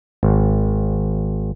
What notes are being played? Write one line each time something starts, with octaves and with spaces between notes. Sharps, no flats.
G#1